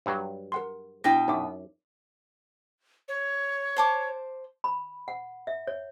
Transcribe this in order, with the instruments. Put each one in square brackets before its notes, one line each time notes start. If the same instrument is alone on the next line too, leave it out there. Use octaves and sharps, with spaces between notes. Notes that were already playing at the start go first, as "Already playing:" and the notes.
[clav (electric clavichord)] G2 F#3
[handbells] A#4 F#5 C6
[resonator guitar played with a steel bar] B2 G5 [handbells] D4 E4 A#6
[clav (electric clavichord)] F#2 [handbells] D#4 E5 D6
[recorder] C#5
[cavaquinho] C5 A5 D6
[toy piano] B5
F#5
E5
C#5